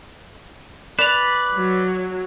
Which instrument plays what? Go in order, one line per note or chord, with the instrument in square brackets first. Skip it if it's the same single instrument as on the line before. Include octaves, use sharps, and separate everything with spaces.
[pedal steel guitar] B4 [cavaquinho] D5 [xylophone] E7 F7
[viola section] F#3